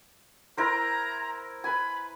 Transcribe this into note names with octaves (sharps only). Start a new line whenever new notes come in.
E4 A#4 C5 A#5
B4 G#5 B5